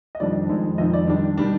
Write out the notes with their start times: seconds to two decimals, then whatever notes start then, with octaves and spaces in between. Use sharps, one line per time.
0.15 D#5
0.20 F2 D#3 G3 D4 D5
0.49 F2 D#3 G#3 D#4
0.78 F2 D#3 G#3 D#4 D#5
0.93 D5
1.07 D#3 G3 D4
1.38 D#3 G3 D4